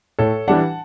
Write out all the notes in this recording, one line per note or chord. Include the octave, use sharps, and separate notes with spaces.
A2 A4 C#5
E3 G3 D4 F#5 A5